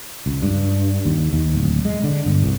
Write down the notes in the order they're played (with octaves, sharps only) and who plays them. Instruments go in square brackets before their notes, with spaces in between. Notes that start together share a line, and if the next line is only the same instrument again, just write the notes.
[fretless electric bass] C#2
G2
D#2
D#2
D1
G#3
D3
G1
C2